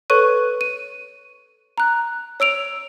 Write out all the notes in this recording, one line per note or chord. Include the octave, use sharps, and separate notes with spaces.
A4 B4 C#5 C#6 F#6 D#7
D#7
A#5 F#6
C#5 E6 D7 F7